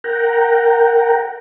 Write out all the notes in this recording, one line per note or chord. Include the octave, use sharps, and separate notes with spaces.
A#4 F#5 G5 A#5